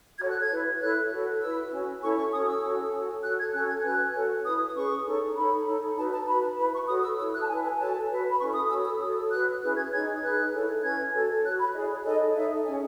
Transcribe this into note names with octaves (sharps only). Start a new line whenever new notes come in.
F#4 A4 C#5 G#6
F#6
G#6
E4 B4
E4 A4 C#5 F#6
F#4 A4 C#5
E4 B4 E6
C#4 F#4 C#5
C#4 E4 A4 C#5 C#6
C#6
C#4 F#4 A4 C#5 D#6
E6
C#4 F#4 A4 C#5
F#4 A4 C#5
F#4 A4 C#5 F#6
G#6
C#4 F#4 A4 F#6
G#6
C#4 F#4 B4 F#6
F#4 A4 C#5
E4 B4 D#6
D#6
C#4 G#4 B4 C#6
D#4 A4 C#5
D#4 A4 C#5 B5
D#4 A4 C#5
D#4 F#4 B4 A5
A5
F#4 B4 B5
E4 B4 B5
C#6
F#4 A4 C#5 D#6
E6
E4 A4 C#5 E6
F#6
A5
E4 B4 G#5
G#5
F#4 A4 C#5 A5
F#4 B4
B5
C#4 E4 A4 C#5 C#6
D#6
F#4 A4 C#5 E6
E6
F#4 A4 C#5 D#6
E6
F#4 B4 F#6
C#4 E4 G#4 B4 F#6
G#6
D#4 G#4 C#5 G#6
D#4 G#4 B4 F#6
E4 A4 C#5
C#4 E4 B4 G#6
F#4 A4 C#5
F#4 C#5 F#6
B5
E4 G#4 C#5 D#5
C#5
D#4 A4 C#5 D#5
D#4 A4 C#5 E5
C#4 G#4 C#5 G#5